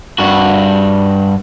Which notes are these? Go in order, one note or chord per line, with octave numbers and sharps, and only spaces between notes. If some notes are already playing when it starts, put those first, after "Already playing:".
G2 F#4